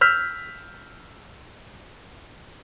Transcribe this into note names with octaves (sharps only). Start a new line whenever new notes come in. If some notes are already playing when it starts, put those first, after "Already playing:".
E6 F6 G6 B6